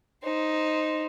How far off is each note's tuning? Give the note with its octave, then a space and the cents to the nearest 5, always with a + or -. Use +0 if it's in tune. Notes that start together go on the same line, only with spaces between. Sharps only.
D#4 +0 C5 +0